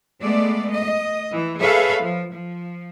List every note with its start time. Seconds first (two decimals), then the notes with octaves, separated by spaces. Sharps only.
0.21 G#3 A3 B3 D5
0.72 D#5
1.30 E3
1.60 G#4 A4 B4 C#5 E5 F5
2.00 F3
2.32 F3